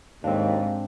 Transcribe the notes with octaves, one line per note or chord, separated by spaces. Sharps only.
D#2 G#2 C4 D4 F5